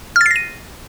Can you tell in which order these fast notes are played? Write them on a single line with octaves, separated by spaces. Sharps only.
F6 A6 C7 A#6 D#7